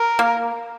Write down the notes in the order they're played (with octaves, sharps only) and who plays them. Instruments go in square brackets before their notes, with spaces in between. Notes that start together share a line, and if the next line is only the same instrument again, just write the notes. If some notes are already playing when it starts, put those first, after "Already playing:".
Already playing: [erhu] A#4
[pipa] A#3